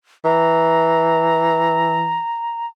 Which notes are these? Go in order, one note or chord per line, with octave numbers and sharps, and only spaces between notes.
E3 A#5